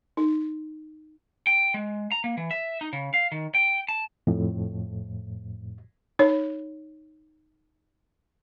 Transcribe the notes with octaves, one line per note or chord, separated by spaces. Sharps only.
D#4
G5
G#3
A#5
A#3
E3
E5
D#4
C#3
F5
D#3
G5
A5
F2 A2
D#4 C#5